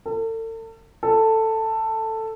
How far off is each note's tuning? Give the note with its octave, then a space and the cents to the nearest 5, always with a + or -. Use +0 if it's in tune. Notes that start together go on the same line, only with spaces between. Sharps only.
A4 +40
A4 +10